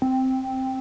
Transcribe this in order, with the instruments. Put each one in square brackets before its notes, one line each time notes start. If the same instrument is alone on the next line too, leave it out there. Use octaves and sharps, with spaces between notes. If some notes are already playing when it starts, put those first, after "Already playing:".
[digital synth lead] C4